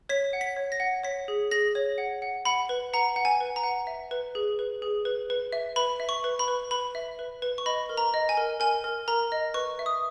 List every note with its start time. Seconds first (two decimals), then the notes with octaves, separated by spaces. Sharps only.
0.09 C#5 B6
0.33 F#5
0.41 B6
0.56 C#5
0.72 A#6
0.80 F#5
1.04 C#5 B6
1.28 G#4
1.51 G#4 A#6
1.75 C#5
1.98 F#5
2.22 F#5
2.45 F#5 B5
2.69 B4
2.93 F#5 A#5
3.16 F#5
3.25 G#5
3.41 B4
3.56 A#5
3.63 F#5
3.87 E5
4.11 B4
4.35 G#4
4.59 B4
4.82 G#4
5.05 B4
5.30 B4
5.52 E5
5.76 B4 B5
6.00 E5
6.09 C#6
6.24 B4
6.39 B5
6.48 B4
6.71 B4 B5
6.95 E5
7.19 B4
7.42 B4
7.58 C#6
7.66 D#5 B5
7.89 A#4
7.97 A#5
8.14 D#5
8.29 G#5
8.37 A#4
8.60 A#4 G#5
8.84 A#4
9.08 A#4 A#5
9.32 D#5
9.54 B4 C#6
9.79 E5
9.86 D#6